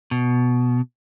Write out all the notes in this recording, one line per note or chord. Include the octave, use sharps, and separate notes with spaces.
B2